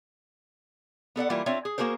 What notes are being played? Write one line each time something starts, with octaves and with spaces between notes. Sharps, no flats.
B3 A4 D5 F#5
E3 G3 A#3 E4 F4
C4 D4 F4 C#5 E5
G#4
A#3 F#4 G#4 A#4 C5